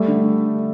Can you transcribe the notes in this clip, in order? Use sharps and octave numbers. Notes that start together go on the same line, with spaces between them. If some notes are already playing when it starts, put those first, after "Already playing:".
Already playing: G3 A3
D3